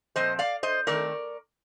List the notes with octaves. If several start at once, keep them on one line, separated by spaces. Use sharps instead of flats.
A#2 F3 C4 C5 D#5
D5 F5
C5 D#5
D#3 A3 C4 A#4 D5